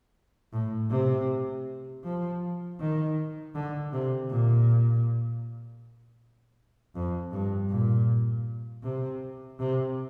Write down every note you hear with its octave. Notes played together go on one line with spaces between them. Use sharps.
A2
C3
F3
D#3
D3
C3
A#2
F2
G2
A#2
C3
C3